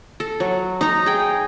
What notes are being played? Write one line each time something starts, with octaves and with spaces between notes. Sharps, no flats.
A4
F#3
D#4 A#5
G#4 G5